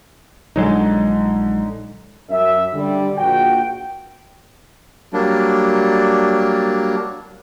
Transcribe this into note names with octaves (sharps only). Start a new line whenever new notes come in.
A#1 D3 F#3 G#3 D#4
F#2 E5
D3 G3
A#1 F#4 G5
F#3 G3 A#3 D4